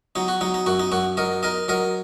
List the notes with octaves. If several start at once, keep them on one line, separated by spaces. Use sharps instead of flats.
F#3 D#4
F#4
F#3 D#4
D#4
F#2 F#4
D#4
F#2 F#4
F#3 A#4 D#5
D#4 A#4 D#5
F#3 A#4 D#5